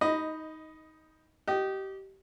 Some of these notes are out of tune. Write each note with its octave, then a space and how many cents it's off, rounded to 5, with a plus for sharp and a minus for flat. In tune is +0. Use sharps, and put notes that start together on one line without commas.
D#4 +15 D#5 +0 B5 +0
G4 -25 D#5 -10